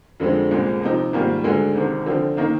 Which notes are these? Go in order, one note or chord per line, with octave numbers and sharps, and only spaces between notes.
F2 D3 G#3 C4
C2 A#2 G#3 C4
C3 F3 C4 D#4
G#2 D#3 G3 A#3 F4
D2 D3 G#3
C2 C3 D#3
D3 F3 C4 F4
D#3 A#3 D#4